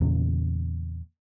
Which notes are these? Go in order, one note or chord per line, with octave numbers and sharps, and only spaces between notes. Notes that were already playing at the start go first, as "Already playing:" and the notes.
E2 A#2 C#3